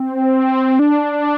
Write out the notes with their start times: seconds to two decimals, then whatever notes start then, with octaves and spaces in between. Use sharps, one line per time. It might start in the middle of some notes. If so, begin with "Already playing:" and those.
Already playing: C4
0.79 D4